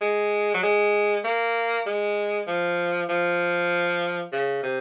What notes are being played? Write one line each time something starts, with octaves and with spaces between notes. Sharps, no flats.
G#3
F#3
G#3
A#3
G#3
F3
F3
C#3
C3